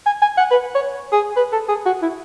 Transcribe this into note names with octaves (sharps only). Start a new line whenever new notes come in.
G#5
G#5
F#5
B4
C#5
G#4
B4
A4
G#4
F#4
E4